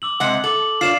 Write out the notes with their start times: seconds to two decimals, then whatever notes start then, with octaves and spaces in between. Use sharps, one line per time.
0.02 D6 E6 F#7
0.20 C3 G#3 F#5
0.44 A4 D6 F#7
0.81 F4 C#5 D5 C7 E7